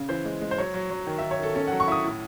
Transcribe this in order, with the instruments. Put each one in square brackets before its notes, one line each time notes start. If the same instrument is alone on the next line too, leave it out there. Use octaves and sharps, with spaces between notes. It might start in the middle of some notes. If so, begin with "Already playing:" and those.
Already playing: [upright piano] C#3
E3 C5
G#3
G#3
C5
F#3 C#5
F#3
F#3
D#3
D#3 E5
C#5
D#3 A4
C#4 A4
F#3 F#5
C#6
E4 D#6
A2